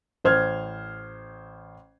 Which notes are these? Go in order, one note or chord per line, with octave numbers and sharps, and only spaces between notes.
A1 C5 F6 G#6